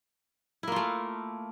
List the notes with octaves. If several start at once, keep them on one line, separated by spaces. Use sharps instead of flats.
A3 A#3 E4 F4